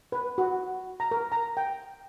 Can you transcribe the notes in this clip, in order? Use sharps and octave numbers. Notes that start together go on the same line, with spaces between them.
B4
F#4
A#5
A#4
A#5
G5